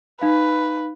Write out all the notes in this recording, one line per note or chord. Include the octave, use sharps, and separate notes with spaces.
D#4 B4 F5